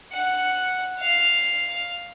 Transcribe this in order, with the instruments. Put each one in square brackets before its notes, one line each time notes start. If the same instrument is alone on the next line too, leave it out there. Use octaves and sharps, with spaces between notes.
[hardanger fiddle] F#5
F5